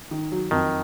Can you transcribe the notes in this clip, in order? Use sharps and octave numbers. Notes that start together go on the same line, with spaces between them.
D#3
F#3
F2 D#3